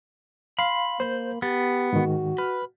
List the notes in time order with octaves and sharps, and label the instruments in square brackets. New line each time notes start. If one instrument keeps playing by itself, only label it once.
[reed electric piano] F5 [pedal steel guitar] B5 C6
[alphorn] A#3 [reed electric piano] C5 G6
[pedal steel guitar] B3 [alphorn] G4 [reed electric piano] A6
[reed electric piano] G#2 D#3 [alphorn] F#4
[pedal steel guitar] B4 [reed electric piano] F6